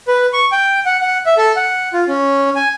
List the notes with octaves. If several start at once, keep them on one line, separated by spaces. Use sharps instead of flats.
B4
C#6
G5
F#5
F#5
E5
A4
F#5
F4
C#4
G#5